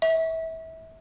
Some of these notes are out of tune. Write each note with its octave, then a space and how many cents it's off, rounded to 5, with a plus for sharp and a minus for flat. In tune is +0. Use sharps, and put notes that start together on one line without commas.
E5 -25